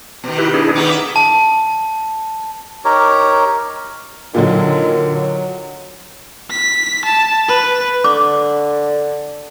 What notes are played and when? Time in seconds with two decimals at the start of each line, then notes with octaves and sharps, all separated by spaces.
0.24 B2 D#3
0.38 E4 G4 B4
0.54 D4 E4 G#4
0.75 D#3 B3 D#4 D6
0.90 E5
1.16 A5
2.85 D#4 G4 A#4 C#5
4.35 A#2 D3 D#3 F#3
5.13 F#3
6.51 B6
7.05 A5
7.48 B4
8.04 D3 D6